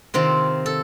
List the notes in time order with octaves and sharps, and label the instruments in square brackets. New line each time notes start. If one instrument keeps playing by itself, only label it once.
[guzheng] C3 D#3 C4 F4
A4